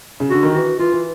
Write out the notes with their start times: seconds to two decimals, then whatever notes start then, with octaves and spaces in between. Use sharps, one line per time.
0.20 C#3
0.30 D3 F#4
0.43 D#3
0.54 E3 F#4
0.79 E3 F4
0.92 E3